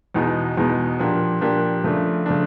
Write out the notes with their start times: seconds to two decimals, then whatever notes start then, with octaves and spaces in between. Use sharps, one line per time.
0.14 E2 B2 G#3 B3 D#4
0.57 E2 B2 G#3 B3 D#4
0.99 A#2 F3 A#3 D4 G4
1.41 A#2 F3 A#3 D4 G4
1.84 C#3 F3 A3 D4
2.26 C#3 F3 A3 D4